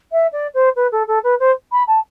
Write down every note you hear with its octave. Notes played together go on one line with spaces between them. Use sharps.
E5
D5
C5
B4
A4
A4
B4
C5
B5
A5